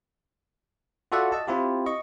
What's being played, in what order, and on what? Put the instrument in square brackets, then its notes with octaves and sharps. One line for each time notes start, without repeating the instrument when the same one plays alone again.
[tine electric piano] F4 F#4 A4 D5 E5 F#5
D#5 A5
C4 E4 F4 G4
D#5 C#6